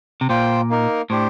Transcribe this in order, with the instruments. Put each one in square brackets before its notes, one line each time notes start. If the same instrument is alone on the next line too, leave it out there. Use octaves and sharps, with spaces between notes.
[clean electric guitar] C3
[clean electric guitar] A#2 [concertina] F4 C5 G5
[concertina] A#3 D#4 A#4
[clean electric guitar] A2 [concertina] D4 G4 C5